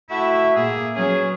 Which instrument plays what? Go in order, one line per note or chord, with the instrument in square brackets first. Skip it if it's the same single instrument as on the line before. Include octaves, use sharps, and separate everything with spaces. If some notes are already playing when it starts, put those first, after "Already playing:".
[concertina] A3 F#4 [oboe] E4 [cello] E5
[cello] A#2 A#3 [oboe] G#4 [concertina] E5
[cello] F#3 B3 [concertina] C#4 [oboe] G#4